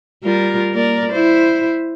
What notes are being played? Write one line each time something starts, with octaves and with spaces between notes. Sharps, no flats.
G3 F4 A#4
A#3 A#4 D5
E4 C5